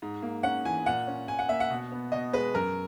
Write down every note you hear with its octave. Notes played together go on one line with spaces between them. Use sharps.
G#2
A#3
C#4 F#5
E3 G#5
A#2 F#5
C#4
A#2 G#5
F#5
A#3 E5
F#5
B2
B3
B2 D#5
G#3 B4
F#2 A#4